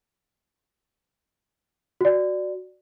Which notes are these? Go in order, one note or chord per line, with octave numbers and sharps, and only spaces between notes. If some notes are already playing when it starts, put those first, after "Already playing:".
F#4 D5